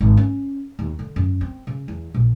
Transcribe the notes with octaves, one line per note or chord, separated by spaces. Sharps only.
G#1
C#4
D#2
D3
F#2
C4
C#3
E2
A#1